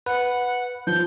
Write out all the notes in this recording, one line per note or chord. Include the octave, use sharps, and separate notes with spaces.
B4 F#5
F3 G6